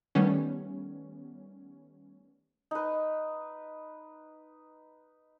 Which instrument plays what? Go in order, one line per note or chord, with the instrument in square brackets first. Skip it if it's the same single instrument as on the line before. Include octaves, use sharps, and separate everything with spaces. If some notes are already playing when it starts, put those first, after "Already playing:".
[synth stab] D#3 G3 A3 B3 C#4
[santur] D#4 B4